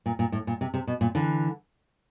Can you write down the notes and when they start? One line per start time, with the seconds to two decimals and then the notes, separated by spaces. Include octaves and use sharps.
0.06 A#2
0.19 A#2
0.32 A2
0.47 A#2
0.61 C3
0.74 C3
0.87 B2
1.01 A#2
1.15 D3 E3